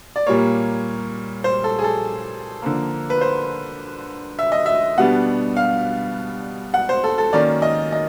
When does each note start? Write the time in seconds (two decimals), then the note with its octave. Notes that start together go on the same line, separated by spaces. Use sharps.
0.16 D5
0.27 A#2 G3 A#3 C#5
1.44 C5
1.64 A4
1.79 G#4
1.84 A4
2.62 D3 F3 A#3
3.10 B4
3.21 C5
4.39 E5
4.52 D#5
4.66 E5
4.98 B2 G3 B3 D4 F#5
5.57 F5
6.74 F#5
6.89 C5
7.04 A4
7.18 A4
7.33 D#3 F#3 A#3 C#4 D5
7.62 D#5
7.92 D#5